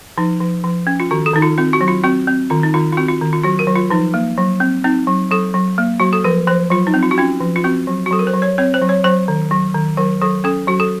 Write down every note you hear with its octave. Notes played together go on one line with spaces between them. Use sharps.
F3 D#4
F3
F3
C#4
F4
D#3 F#4
A4
D#3 D#4
F4
C4 F4
F#4
F#3
F4
C4 F#4
C4
D#3 F4
D#4
D#3 F4
F4
C4 F#4
F4
D#3
F4
F#3 F#4
A#4
F#3
F4
F3 D#4
A#3
F#3
C4
C4 D#4
F#3
F#3 A4
F#3
A#3
F#3 F#4
A4
F3 A#4
F3 C5
F#3 F4
D#4
C4
F4
F#4
C#4 F4
F3
F4
C4 F#4
F#3
F#4
F#3 A4
A#4
C5
F#3
C#5
C4 C#5
C5
F#3
C#5
F#3 C5
D#3
F#3
D#3
F#3 A#4
F#3 A4
C#4 A4
F#3 F#4
A4